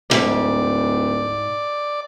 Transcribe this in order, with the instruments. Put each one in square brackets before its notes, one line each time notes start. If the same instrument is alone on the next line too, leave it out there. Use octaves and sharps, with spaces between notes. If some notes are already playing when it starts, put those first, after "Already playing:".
[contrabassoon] D1 [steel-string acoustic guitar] D2 G#2 [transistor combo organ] D5